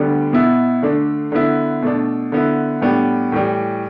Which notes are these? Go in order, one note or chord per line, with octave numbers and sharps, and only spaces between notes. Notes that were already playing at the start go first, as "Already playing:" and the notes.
Already playing: D2 D3 G3 B3 D4
B2 B3 E4
D3 A3 D4
D3 B3 E4
B2 A3 D4
D3 B3 E4
A2 G3 B3 D4
A2 E3 G3